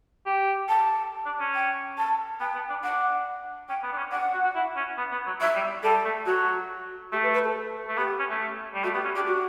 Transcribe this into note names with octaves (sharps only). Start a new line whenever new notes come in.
G4
A5
D4
C#4
G5
A5
B3 G5
B3
D4
D4 F#5
C#4 G5
B3
D4
C#4
D4 F#5
F#4
F#4
E4
C#4
B3
B3
F#3
F#3 E5
G3
G3 A4
A3
F#3 F#4
A3 G4
B4
B4
A4
A3
B3 G4
C#4
A3
G3
A3 F#4
B3 G4
C#4
D4 G4
F#4